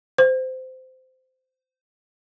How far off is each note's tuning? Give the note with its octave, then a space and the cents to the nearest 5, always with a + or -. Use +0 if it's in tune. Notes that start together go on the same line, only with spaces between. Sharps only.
C5 -20